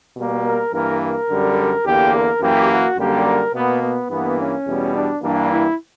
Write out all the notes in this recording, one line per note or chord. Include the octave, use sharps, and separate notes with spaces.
B2 G3 A#3
A#4
G2 E3 A#3 A#4
A#4
F#2 D3 G3
E2 D3 A#3 G4
A#4
F#2 E3 A#3 G4
F#4
F#2 D3 G3 A#3 G4
A#4
B2 A#3 B3
B3
G2 E3 A#3 B3
C#4
E2 B2 G3
D4
G2 E3 G3 A#3 D4
E4